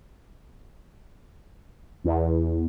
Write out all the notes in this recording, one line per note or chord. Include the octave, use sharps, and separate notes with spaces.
E2